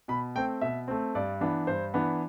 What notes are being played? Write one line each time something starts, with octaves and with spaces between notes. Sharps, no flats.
B2 B5
A3 C4 G5
B2 E5
A3 C4
G2 D5
E3 B3 D4
G2 C5
E3 B3 D4